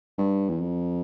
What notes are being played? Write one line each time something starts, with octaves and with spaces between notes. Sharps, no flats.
G2
E2
F2